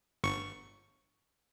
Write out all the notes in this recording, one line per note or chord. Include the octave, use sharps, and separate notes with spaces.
G1 C#6